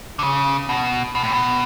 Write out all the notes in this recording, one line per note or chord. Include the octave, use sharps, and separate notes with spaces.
D3
C#3
B2
B2
A2
B2